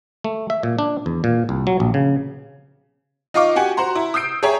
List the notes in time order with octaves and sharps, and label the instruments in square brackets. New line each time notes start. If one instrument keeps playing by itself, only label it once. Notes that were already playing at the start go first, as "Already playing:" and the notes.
[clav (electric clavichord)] A3
E5
A#2
D4
E2
A#2
C2
F#3
A#1
C#3
[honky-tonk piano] D#4 F4 D#5 F5 C#6 D6
F#4 G4 F#5 G#5
F#4 C5 F#5 A#5 C6
E4
D#6 E6 G6 C7 D7
G#4 C#5 E5 G5 G#5 A#5